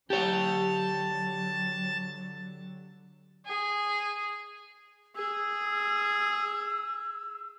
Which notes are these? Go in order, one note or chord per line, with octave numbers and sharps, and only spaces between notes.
D3 F#3 G4 C#5 A5
G#4
G#4 E6